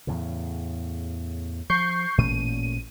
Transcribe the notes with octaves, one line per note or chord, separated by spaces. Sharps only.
E2 A2 C#3
F3 C#6 G6 C7
A1 A#2 A3 C#4 D#7